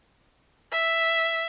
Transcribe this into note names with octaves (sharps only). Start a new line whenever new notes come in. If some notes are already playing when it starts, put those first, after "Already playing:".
E5